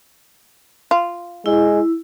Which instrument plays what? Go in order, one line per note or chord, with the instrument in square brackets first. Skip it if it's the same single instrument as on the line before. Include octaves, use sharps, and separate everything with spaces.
[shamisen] F4
[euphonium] G#3 [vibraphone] E4